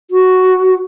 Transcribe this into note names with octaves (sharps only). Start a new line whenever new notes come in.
F#4